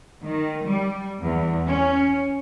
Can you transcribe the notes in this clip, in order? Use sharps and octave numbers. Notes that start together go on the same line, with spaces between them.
D#3
G3
E2
C#4